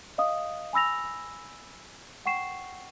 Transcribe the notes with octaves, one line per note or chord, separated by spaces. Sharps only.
D#5 F5 D#6
G#5 B5 E6 A#6 F7
F#5 G5 C#6 C7 E7